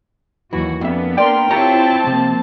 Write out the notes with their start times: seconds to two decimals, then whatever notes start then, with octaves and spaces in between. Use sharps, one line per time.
0.53 D#2 E3 F#3 F#4
0.81 F2 A#3 B3 D4 E5
1.18 A#4 D5 G5 C6
1.51 C4 E4 F4 G4 C#5 A5 A#5
2.07 C3 F3 A#3